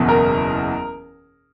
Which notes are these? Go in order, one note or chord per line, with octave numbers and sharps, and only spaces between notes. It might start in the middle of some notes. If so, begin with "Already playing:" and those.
Already playing: F#1 E2 B2
A#4